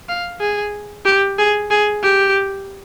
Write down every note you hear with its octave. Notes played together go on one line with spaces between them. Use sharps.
F5
G#4
G4
G#4
G#4
G4